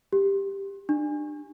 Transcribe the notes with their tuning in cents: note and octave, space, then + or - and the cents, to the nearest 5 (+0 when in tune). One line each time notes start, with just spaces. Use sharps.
G4 +5
D4 +30